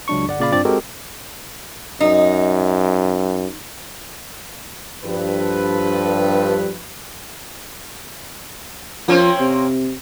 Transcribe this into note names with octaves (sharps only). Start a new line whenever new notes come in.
C#2 F#3 D4 C#6
G1 D5 F#5
A#2 C#3 D5 F5 B5
G2 C4 D4 F4 D5 A6
G#3 C4 F#4 G4 A4 A#4
F#2 D#4
G2 F3 A4 B4
F3 A#3 C4 C#4
C3